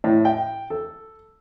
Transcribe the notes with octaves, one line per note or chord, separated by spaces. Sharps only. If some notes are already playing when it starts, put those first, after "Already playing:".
A2
G5
A4